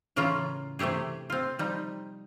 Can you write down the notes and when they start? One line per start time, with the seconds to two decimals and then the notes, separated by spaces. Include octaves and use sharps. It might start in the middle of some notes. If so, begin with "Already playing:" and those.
0.16 A2 C#3 E3 C#4 F4 A#5
0.79 C3 E3 A3 G4 G#4
1.30 C4 F4
1.59 F3 G3 D#4